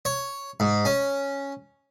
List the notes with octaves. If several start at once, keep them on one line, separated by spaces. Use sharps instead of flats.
C#5
G#2
C#4